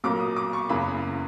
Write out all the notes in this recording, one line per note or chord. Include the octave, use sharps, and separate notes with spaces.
B1 A#2 F#3 A#3 D6
D#6
D6
C#6
F#1 E2 C#3 E3 B5